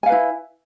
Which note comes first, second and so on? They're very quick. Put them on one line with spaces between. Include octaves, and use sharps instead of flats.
G#5 F5 B4 E4